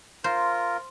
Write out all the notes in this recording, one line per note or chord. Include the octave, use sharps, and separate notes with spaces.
F4 A#4 C5